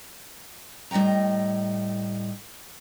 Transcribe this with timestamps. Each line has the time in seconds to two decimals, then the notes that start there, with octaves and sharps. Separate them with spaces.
0.91 A2 G3 D#5 G5 A#5